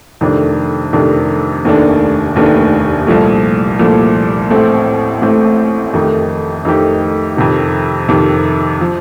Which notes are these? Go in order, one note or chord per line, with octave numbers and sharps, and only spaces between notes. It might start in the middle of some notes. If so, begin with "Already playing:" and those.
F2 C3 D#3 A3 D4
F2 C3 D#3 A3 D4
F1 D#2 D#3 A3 D4
F1 D#2 D#3 A3 D4
C2 A#2 F3 A3
C2 A#2 F3 A3
A1 A2 A3 C4
A1 A2 A3 C4
F2 D#3 A3 D#4 G4
F2 D#3 A3 D#4 G4
F2 C3 D#3
F2 C3 D#3
F3